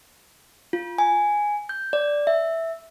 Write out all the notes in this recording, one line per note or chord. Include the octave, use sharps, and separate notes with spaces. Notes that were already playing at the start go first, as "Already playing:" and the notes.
F4
G#5
G6
D5
E5